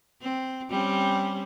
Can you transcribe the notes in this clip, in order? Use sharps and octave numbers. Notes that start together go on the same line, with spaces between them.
C4
G3 C4 C#4